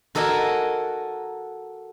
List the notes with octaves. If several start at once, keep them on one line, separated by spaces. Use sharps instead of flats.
F#4 A4 A#4 D#5 F#5 G#5